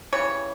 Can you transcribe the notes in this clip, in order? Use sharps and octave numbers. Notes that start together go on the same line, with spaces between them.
C#3 E3 G3 C#5